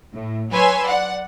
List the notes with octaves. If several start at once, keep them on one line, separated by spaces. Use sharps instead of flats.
A2
F#3 B4 C#5 G#5 C6 E6
D5 F#5